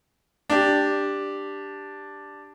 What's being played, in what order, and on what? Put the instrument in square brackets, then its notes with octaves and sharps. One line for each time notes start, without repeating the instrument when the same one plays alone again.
[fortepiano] D4 G4